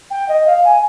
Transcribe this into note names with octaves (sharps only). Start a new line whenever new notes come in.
G5
D#5
F5
G#5